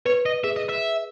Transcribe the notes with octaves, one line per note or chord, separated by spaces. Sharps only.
B4 C#5
D#5
G#4 E5
D#5
E5